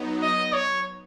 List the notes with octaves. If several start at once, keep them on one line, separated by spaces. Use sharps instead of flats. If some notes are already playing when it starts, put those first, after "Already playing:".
Already playing: F#3 B3 D#4
D#5
C#5